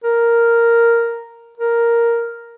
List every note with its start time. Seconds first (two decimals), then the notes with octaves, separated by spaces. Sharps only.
0.04 A#4
1.57 A#4